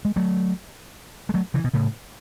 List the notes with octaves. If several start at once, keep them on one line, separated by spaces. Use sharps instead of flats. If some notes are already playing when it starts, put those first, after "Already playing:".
G#3
F#3 A3
G#3
F#3 A3
C#3 E3
B2
A2 C#3